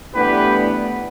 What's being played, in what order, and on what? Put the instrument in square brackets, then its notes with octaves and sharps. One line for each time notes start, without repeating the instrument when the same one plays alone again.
[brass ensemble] A2 E3 G3 B3 D4 G4 B4